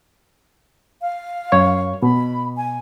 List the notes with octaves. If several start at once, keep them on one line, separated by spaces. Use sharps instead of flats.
F5
F#2 C#5 C#6
B2 B5
G#5